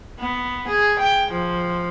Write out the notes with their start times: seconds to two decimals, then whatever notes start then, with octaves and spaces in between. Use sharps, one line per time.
0.19 B3
0.68 G#4
0.99 G5
1.31 F3